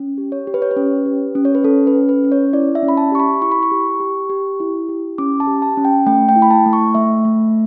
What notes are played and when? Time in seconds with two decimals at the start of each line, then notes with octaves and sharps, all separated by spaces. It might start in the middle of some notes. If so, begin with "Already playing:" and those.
Already playing: C#4
0.18 G4
0.32 C#5
0.47 G4
0.54 B4
0.62 C#5
0.71 B4
0.77 C#4
1.06 G4
1.35 C#4
1.45 C#5
1.55 B4
1.64 C#4 A4
1.87 B4
1.95 C#4
2.09 B4
2.24 C#4
2.32 C#5
2.53 E4 D5
2.75 E5
2.83 C#4
2.88 B5
2.97 A5
3.12 G4 C#6
3.20 B5
3.41 E4 C#6
3.52 B5
3.63 C#6
3.72 G4
4.00 G4
4.30 G4
4.60 E4
4.89 G4
5.18 C#4 D6
5.40 A5
5.47 G4
5.62 A5
5.77 C#4
5.85 G5
6.06 A3 G5
6.29 G5
6.36 E4
6.42 B5
6.51 A5
6.66 A3
6.73 C#6
6.94 A3 E5
7.25 A3